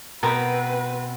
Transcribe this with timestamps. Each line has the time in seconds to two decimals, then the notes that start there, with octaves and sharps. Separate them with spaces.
0.23 B2 C4 A#4 B4 A#5 B5